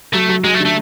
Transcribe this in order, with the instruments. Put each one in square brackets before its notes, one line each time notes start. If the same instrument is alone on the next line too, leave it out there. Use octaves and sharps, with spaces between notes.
[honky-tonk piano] F#3 [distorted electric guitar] A3
[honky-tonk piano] F#3
[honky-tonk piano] F#3 [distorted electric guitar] G#3
[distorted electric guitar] A3
[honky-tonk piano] D3
[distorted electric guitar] A3